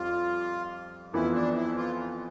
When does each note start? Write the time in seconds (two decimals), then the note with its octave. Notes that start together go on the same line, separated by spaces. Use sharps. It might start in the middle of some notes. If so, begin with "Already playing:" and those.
Already playing: F2 G3 F4
1.13 F2 E3 B3 E4 F4
1.35 D4
1.56 E4
1.77 F4